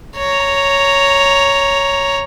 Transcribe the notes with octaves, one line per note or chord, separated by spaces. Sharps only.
C#5 A#5